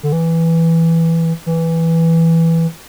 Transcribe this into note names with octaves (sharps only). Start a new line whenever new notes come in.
D3
E3
E3